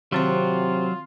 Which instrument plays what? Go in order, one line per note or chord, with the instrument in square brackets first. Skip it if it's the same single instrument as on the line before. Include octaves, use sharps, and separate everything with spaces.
[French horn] C3 [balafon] D#3 C4 C5 [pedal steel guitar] F#3 [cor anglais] F4